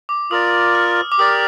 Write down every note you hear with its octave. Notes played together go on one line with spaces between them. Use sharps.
D6
F4 A#4 D5 D#6
F6
D6
G4 A#4 D5 D#6